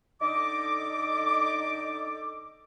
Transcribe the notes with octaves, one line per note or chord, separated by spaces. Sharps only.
D3 D#4 A4 D#5 D6